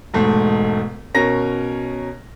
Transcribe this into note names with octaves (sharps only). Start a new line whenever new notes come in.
E1 G#2 A3
B2 C#4 A#4 A#6